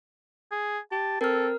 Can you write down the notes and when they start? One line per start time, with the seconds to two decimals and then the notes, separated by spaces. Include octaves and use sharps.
0.51 G#4
0.92 G4 A5
1.21 C4 A4 A#4 F6